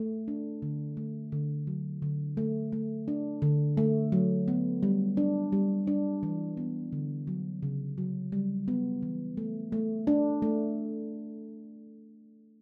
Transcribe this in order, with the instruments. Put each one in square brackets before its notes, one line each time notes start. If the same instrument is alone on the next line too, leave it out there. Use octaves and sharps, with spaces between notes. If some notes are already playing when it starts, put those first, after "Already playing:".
Already playing: [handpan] A3
D4
D3
A3
D3
F#3
D3
A3
A3
D4
D3
A3
F#3
B3
G3
D4
G3
D4
E3
B3
D3
F#3
C#3
F#3
G3
B3
E3
A3
A3
D4
A3